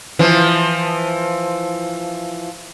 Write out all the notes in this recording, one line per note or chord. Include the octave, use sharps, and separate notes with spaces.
E3 F3